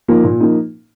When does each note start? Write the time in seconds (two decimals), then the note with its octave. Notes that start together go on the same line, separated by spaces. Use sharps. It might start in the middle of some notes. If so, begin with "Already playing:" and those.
0.08 F3 A#3 D#4
0.24 A#2
0.40 F3 A#3 D#4